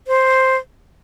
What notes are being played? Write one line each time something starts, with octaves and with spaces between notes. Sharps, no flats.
C5